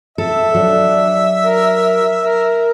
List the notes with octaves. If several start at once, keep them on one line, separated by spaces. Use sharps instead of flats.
A4 E5
F#3 D4
A#4
A#4